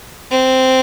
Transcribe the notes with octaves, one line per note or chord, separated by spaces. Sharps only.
C4